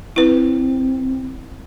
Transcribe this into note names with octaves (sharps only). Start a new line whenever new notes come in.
C4 E4 B4